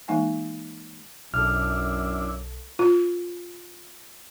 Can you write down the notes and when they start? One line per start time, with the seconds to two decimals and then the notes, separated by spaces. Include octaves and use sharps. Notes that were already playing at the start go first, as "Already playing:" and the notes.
0.08 E3 G#3 A#3 D#4 F#5 G#5
1.34 B1 F#2 D4 E4 A4 F6
2.79 F4